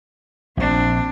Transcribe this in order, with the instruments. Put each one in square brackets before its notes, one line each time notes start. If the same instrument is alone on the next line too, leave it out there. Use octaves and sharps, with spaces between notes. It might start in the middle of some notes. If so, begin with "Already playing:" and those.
[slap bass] A#1 [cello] C4 D4